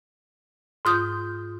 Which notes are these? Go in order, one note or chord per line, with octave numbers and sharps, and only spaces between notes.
G#2 F4 D#6 G6